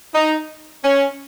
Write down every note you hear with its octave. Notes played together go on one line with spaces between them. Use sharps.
D#4
C#4